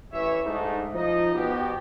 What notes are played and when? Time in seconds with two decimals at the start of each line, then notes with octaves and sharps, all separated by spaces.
0.13 A1 E3 C#5 E5
0.46 G#2 A3 D4 D#4
0.95 F3 D#4 D#5
1.35 B2 G4